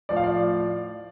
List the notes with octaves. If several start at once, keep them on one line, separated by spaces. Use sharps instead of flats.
A2 F3 D5
F5
D5